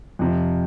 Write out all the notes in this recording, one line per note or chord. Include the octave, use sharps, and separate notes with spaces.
F2 C3 F3